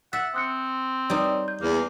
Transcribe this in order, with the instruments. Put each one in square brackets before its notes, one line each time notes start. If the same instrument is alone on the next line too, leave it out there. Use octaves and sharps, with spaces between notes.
[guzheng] E5 [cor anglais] F#5 [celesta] F#6 A6
[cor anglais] C4 [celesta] D#6 F#6 C#7
[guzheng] G3 D#4 [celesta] B4 C#5 D5
[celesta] G6
[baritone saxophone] E2 [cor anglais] A#3